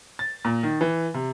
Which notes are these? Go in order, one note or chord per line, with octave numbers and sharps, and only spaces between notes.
A6
A#2
D#3
E3
C3